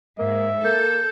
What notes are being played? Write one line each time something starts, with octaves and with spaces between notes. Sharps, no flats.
G#2 A#3 E5
A#3 A4 G6